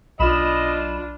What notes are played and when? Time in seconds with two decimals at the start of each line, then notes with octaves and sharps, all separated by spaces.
0.19 B1 D4 F4 D#5 B5 E7